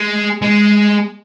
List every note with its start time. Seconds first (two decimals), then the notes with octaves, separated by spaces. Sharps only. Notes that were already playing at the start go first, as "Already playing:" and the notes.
Already playing: G#3
0.42 G#3